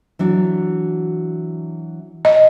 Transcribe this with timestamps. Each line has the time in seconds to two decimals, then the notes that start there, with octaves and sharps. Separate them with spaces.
0.19 E3 F#3 D4
2.25 D#5